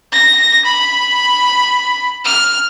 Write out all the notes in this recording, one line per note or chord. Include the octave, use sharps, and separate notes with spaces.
A#6
B5
F6